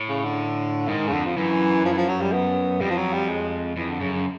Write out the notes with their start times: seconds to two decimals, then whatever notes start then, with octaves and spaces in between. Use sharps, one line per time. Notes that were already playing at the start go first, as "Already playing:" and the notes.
Already playing: A2
0.09 C#3
0.24 D3
0.88 G#2 D#3
1.08 C#3
1.13 F2 D3
1.26 F3
1.37 F#2 E3
1.85 F3
1.93 E3
1.97 F3
2.09 F#3
2.21 G3
2.33 B3
2.81 F2 G3
2.90 F3
2.97 F#3
3.13 G3
3.29 G#3
3.76 F2 E3
3.89 D3
4.01 F#2 C#3
4.13 C#3